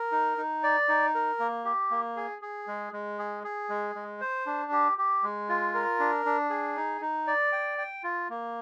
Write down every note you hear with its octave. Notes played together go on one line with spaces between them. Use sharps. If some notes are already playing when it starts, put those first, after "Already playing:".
Already playing: A#4
D#4
D#4
D5
D#4
A#4
A#3
G4
A#3
G#4
G#4
G#3
G#3
G#4
G#4
G#3
G#3
C5
D4
G4
G4
G#3
F4
A#4
D4
D4
G#4
D#4
D#4
D5
G5
G5
F4
A#3